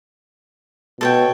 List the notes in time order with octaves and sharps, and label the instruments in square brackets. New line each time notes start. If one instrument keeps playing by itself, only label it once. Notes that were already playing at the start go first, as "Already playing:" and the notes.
[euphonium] B2 [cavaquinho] A4 C#5 G5